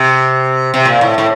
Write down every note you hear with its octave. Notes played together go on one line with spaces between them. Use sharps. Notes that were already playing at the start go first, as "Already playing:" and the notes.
Already playing: C3
C3
A#2
A2
A2